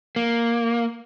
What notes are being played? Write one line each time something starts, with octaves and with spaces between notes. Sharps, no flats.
A#3